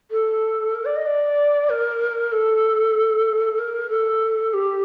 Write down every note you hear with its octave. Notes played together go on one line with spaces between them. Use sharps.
A4
A#4
D5
D#5
D5
A#4
A4
A#4
A4
G4